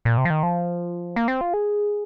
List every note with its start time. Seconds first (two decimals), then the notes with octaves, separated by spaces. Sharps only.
0.05 A#2
0.18 C3
0.25 F3
0.30 D#3
0.43 F3
1.16 A#3
1.28 C4
1.41 F4
1.54 G#4